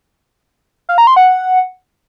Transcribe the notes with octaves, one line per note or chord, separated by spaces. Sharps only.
F5
A#5
C6
F#5